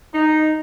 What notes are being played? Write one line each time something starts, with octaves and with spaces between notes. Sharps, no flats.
D#4